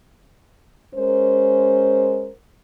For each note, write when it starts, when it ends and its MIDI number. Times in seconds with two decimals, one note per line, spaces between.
0.95 2.30 56
0.95 2.30 61
0.95 2.30 70
0.95 2.30 72